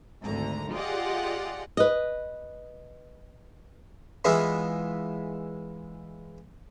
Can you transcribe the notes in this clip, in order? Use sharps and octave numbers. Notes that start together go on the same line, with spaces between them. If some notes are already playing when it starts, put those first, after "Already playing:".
G#1 D2 D3 A#5
F4 G4 G#4 D5 D#5 F#5
B4 D#5
E3 G#3 B3 E4 F4